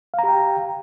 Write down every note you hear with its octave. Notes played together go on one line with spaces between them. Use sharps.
G4 F5 G5 A#5